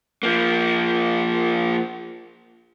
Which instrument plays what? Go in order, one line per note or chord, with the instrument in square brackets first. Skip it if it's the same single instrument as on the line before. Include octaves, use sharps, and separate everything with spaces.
[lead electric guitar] F3 A#3